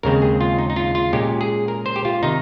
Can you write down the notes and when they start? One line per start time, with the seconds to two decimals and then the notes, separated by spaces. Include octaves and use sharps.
0.03 D#2 C#3 G#3 C4 A#4
0.22 G#4
0.41 F4
0.59 D#4
0.70 D#4
0.76 F4
0.95 F4
1.13 A#2 G#3 C#4 G4
1.41 G#4
1.68 A#4
1.86 C5
1.96 G4
2.05 F4
2.23 C3 D#3 D#4